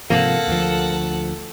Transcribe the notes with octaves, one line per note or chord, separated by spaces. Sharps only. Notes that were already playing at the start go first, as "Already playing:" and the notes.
G#2 C3 F3 A#3 A4 F#5
D2 F3